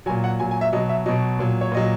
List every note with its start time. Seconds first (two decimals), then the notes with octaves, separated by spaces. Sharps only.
0.06 F#3 G#5
0.10 A#2
0.24 F#5
0.39 A#2 F#3 G#5
0.51 G#5
0.61 E5
0.73 B2 F#3 D#5
0.89 E5
1.06 B2 F#3 D#5
1.39 A#2 F#3
1.61 C#5
1.72 A#2 F#3 D#5